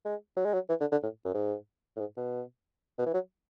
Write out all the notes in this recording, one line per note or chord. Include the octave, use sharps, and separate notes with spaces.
G#3
F#3
G#3
F#3
E3
D3
D3
A2
F#2
G#2
A2
G#2
B2
B2
E3
F#3